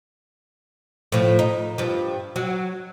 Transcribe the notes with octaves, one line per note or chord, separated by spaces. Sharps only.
A2 F3
D#4
G2 F3
F#3